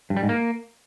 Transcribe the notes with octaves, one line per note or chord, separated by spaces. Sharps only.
G2
G3
G#2
A#3